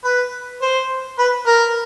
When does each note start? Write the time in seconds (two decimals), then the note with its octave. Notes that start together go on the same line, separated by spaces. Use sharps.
0.04 B4
0.62 C5
1.19 B4
1.47 A#4